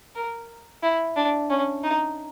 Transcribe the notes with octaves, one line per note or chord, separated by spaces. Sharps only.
A#4
E4
D4
C#4
D#4